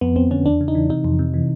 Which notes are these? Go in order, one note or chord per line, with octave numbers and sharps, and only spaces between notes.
F2 B3
F2 C4
D3 C#4
E2 D4
C#3
D#4
E3
C3 D#4
F2
C3
E3